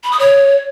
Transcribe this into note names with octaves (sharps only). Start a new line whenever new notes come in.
B5
D#6
C#5